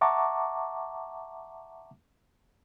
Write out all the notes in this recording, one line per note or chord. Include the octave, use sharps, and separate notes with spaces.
E5 F#5 A5 A#5 C#6 D6